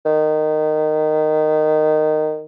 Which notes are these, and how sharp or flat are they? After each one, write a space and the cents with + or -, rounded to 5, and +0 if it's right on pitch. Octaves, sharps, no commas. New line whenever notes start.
D#3 -15